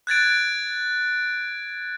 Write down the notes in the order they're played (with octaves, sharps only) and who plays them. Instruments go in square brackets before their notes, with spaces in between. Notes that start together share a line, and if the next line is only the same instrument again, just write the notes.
[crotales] F#6 G#6 A6 D7